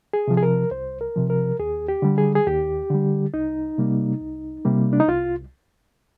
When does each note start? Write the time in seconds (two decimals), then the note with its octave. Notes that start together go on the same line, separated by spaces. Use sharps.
0.13 G#4
0.28 C3 F3
0.37 G#4
0.43 A#4
0.71 C2 C5
1.01 A#4
1.16 C3 F3
1.30 A#4
1.59 D#2 G#4
1.88 G4
2.02 D3 G3
2.18 G#4
2.35 G#4
2.46 D#2 G4
2.90 D3 G3
3.34 C2 D#4
3.78 C3 G3 A#3
4.21 C2
4.65 C3 G3 A#3
4.93 D4
5.00 D#4
5.08 C2 F4